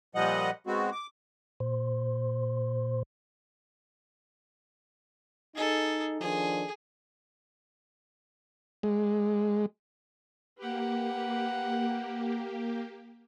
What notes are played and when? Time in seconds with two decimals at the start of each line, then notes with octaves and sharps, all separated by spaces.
0.15 A#2 F3 G3 D#5 F#5
0.67 G#3 B3 C4 F#4
0.92 D6
1.60 A#2 C5
5.56 D#4 G#4 A4
6.21 D#3 F3 D4 G#4
8.83 G#3
10.58 A#3 G4 B4 F#5